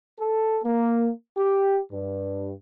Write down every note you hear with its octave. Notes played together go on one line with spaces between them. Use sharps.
A4
A#3
G4
G2